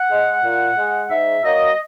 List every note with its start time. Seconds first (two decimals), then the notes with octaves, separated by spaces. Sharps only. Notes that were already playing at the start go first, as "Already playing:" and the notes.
Already playing: F#5
0.11 G#3
0.44 A#2
0.77 G#3
1.10 G#2 E5
1.44 F#3 A#3 D#5